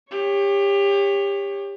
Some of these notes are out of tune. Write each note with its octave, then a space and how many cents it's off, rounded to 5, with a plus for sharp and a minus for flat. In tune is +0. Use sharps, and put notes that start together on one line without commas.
G4 +25 C#5 +0